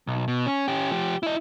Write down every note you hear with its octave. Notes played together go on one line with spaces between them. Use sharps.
B1
B2
C#4
C#4 G4
F3 G4
E4 D#5